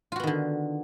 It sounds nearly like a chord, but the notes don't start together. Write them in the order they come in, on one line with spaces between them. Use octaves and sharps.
F4 F#4 B3 D#3 D3